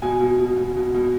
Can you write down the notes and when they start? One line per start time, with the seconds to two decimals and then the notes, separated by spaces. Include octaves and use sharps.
0.02 B2 G#5
0.20 B2
0.39 B2
0.57 B2
0.76 B2
0.94 B2